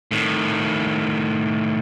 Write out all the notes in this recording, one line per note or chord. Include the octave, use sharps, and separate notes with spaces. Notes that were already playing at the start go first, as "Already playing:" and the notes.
A2 D#3